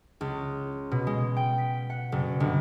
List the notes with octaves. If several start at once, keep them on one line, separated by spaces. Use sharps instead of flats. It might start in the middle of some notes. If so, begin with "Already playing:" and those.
C#2
B2
G#3
G5
B6
F#5
F#1
G1